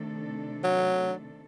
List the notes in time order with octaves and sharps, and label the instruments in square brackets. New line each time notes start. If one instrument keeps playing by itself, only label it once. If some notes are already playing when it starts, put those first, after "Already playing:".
Already playing: [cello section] C3 D#3 A3 D4 A4
[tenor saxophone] F#3